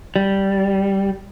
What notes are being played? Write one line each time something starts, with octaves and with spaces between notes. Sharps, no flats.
G3